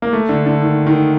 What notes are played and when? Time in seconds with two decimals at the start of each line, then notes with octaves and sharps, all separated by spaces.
0.02 A#3
0.13 A3
0.29 D3
0.46 D3
0.62 D#3
0.87 D#3